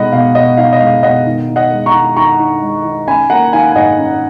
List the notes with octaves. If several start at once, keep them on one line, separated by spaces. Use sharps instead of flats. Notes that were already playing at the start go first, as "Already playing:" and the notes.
Already playing: B2 G#3 D#4 D#5 F#5 B5
B2 F5
B2 D#5
D#4 F5
D#5
G#3 F5
B2 D#5 F#5
D#3
D#4
D#5 F#5
G#3
A#5 C#6
D#3
D#3 A#5 C#6
D#4
G#3
D#3
C#4 G#5 B5
A#3 F#5 A#5
D#3 F5 G#5
G#5
G#2 D#5 F#5
C#4